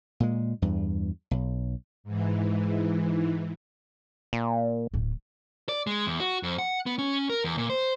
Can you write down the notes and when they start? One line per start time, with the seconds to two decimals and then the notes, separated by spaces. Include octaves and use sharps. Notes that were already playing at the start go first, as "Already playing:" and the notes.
0.20 A#2 G#3
0.62 E2 G2
1.31 B1
2.04 G#2 E3
4.33 A#2
4.94 D1 A2
5.69 D5
5.87 G#3
6.06 E2
6.20 F#4
6.43 F2
6.58 F#5
6.86 B3
6.99 C#4
7.30 A#4
7.44 E2
7.58 A#2
7.70 C5